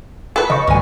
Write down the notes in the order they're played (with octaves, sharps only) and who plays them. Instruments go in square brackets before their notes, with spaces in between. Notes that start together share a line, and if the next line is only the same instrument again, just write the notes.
[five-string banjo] A4 B4
[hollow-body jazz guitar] C#3 [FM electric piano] D#5 C#6
[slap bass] G1 [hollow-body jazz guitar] D2 G#5